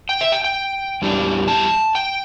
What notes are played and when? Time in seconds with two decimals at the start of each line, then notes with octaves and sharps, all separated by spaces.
0.09 G5
0.21 E5
0.32 G5
0.44 G5
1.02 E2 E3 G3 D4
1.48 A5
1.95 G5